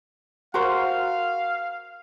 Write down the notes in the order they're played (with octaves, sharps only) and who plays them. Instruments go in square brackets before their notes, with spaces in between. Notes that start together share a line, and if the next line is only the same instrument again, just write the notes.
[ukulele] F#4 A#4 C5 [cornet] F5